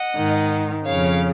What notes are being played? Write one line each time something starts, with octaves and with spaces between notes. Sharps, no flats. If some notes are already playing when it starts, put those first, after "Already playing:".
Already playing: D#5 F#5
G#2 D#3
F2 C#3 C#5 F5